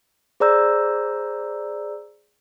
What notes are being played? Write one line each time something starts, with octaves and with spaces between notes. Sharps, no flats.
G#4 C5 D5 A#5 E6 G6